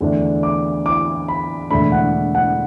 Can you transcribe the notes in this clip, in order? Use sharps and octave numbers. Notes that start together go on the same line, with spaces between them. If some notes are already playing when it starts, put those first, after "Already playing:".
E2 D3 A3 D4
D6
D6
B5
E1 E2 D3 A3 D4 B5
F#5
F#5